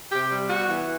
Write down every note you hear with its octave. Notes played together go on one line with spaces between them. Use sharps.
C3 G4
G3
B3 F#4
E3